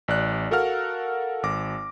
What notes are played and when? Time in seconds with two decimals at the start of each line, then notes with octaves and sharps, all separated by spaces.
0.08 A1 D5 F#6
0.51 F#4 A4 A#4 F5 F#5 F6
1.43 G#1 D6 A#6